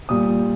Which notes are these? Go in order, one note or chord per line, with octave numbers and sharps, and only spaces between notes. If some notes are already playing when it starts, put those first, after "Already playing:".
A#2 G3 D#6